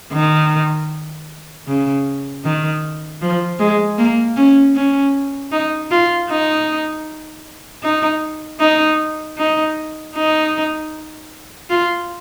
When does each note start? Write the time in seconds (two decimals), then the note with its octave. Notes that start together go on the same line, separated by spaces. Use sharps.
0.13 D#3
1.68 C#3
2.44 D#3
3.21 F3
3.60 G#3
3.98 A#3
4.37 C#4
4.75 C#4
5.52 D#4
5.91 F4
6.30 D#4
7.83 D#4
8.60 D#4
9.38 D#4
10.16 D#4
11.70 F4